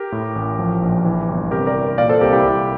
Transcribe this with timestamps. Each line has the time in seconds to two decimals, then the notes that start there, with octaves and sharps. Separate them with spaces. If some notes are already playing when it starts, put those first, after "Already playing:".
Already playing: G4 A#4
0.12 A2
0.36 A1
0.59 F3
0.82 A#1
1.05 E3
1.29 G1
1.51 C3 G4 A#4
1.67 A#4 D5
1.75 E3
1.98 A#2 D5 F5
2.09 A4 C5
2.21 C2 G4 A#4
2.33 E4 G4
2.44 C2